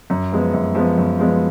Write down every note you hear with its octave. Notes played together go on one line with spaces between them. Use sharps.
F#2
F3 G#3 B3
F#2
F3 G#3 B3
F#2
F3 G#3 B3